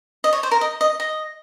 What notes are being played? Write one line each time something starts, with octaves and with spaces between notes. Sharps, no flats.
D#5
C#5
C5
A#4
D#5
D#5
D#5